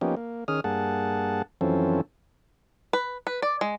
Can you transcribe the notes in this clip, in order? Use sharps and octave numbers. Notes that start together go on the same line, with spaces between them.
F3 A#3 B3 C#4 D#4 G4
A#3
D#3 C#4 G#4 D#6 F6
G2 A#3 G#4 F#5 A5
F#2 E3 F3 C4 C#4 A4
B4
B4
D5
G#3